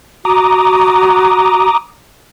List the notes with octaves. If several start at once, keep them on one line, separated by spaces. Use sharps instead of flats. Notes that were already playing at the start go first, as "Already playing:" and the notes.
F#4 A#5 D6 D#6